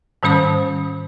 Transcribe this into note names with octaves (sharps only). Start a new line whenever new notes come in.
G#2 D#3 G3 C#4 C5 D#6